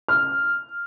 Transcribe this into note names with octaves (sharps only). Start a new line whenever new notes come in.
F6